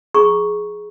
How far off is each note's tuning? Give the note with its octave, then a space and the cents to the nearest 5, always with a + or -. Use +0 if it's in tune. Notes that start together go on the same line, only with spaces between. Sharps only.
G#4 +10 A#5 +20 C#6 +0